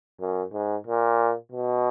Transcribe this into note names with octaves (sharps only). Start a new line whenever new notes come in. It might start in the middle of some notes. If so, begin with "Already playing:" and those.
F#2
G#2
A#2
B2